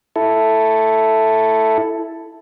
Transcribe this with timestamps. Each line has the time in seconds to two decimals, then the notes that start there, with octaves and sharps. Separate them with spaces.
0.16 E4 A4